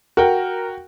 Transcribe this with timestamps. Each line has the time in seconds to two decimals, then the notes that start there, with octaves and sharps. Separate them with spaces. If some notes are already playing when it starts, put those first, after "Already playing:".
0.17 F#4 A#4 G5